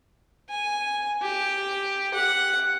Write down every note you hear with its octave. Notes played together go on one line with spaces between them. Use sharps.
G#5
G4
F#5